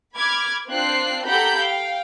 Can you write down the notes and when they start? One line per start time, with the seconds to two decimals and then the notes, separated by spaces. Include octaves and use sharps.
0.16 B5 D6 F6 G#6
0.69 C4 D4 F4 G5 F#6 C7
1.25 G4 A4 F#5 A#5 B5 G6
1.57 F5 G5